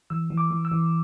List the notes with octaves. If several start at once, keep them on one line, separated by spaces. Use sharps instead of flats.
E3 E6
E3
D6
E3
E6
E3